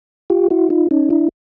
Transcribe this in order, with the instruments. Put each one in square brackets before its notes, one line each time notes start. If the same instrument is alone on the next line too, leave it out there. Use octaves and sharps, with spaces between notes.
[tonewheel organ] F4 G4
E4 F#4
D#4 F4
C#4 D#4
D4 E4